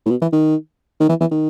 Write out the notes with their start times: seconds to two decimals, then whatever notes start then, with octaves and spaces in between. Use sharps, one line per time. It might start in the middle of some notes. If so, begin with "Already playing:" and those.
0.06 A2
0.10 B2
0.21 E3
0.32 D#3
1.00 D#3
1.09 E3
1.20 E3
1.31 D#3